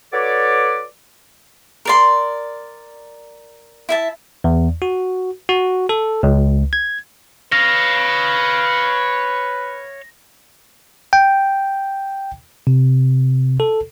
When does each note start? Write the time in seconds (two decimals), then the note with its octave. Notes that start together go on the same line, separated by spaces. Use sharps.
0.13 F#4 A4 B4 C#5 D5
1.85 A#4 D5 C6
3.89 E4 E5 A5
4.44 E2
4.82 F#4
5.49 F#4
5.89 A4
6.23 C#2
6.73 G#6
7.52 B4 C#5 F5 A#6
11.13 G5
12.67 C3
13.60 A4